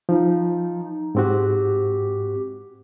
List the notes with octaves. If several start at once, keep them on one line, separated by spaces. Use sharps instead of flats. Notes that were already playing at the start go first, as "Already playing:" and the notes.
F3 D#4
G#2 C4 F#4 G4